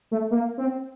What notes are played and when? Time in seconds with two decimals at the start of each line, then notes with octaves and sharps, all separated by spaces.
0.11 A3
0.31 A#3
0.58 C4